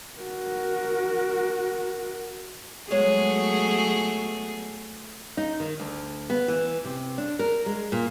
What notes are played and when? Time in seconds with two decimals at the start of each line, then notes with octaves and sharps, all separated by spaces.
0.20 F#4 A#4
2.91 F#3 G#3 A3 B3 G#4 C#5
5.37 D#4
5.60 D#3
5.80 D2
6.30 B3
6.48 E3
6.85 C3
7.18 D4
7.39 A#4
7.66 G#3
7.92 A#2